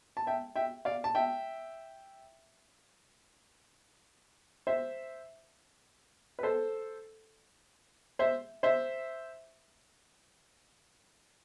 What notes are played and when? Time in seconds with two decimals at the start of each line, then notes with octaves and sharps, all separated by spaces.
0.17 A5
0.27 E5 G5
0.56 E5 G5
0.85 D5 F5
1.04 A5
1.15 E5 G5
4.67 C5 E5
6.39 B4
6.43 A4 C5
8.19 C5 E5
8.63 C5 E5